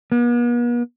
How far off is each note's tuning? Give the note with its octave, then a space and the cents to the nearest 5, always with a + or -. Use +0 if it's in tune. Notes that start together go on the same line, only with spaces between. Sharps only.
B3 -45